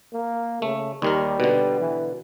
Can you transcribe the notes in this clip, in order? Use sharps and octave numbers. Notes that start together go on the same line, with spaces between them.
A#3
C#3 A3
D#2 D#3 G3 A#4
B2 D3
E3